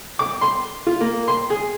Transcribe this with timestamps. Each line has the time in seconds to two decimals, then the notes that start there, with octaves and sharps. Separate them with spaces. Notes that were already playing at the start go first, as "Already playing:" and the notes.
0.19 D6
0.41 C6
0.87 F4
1.01 A#3
1.28 C6
1.50 G#4